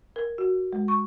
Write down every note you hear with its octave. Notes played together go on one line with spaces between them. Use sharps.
A#4
F#4
G#3
C#6